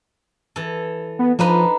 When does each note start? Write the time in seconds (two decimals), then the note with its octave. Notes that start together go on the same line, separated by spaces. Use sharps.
0.56 E3 A4
1.19 B3
1.39 F3 D4 D#4 B4